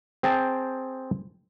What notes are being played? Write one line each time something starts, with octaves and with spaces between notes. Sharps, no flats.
C4 G#4 G5 A5